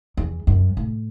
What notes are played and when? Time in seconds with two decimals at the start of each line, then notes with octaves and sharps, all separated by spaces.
0.17 E2
0.47 F#2
0.77 A2